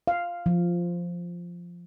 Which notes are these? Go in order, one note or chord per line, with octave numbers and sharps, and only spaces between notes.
F5
F3